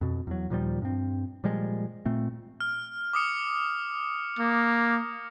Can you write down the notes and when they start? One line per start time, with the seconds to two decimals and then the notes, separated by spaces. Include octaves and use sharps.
0.01 F2 B2
0.27 E2 F#3
0.50 D#2 A#2 F3 G3
0.82 G2 C4
1.44 A#2 F3 G3 G#3
2.05 A#2 A3 C4
2.60 F6
3.13 D6 D#6 C#7
4.39 A#3